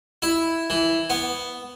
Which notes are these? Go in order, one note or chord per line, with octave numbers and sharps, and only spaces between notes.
E4
E3
B3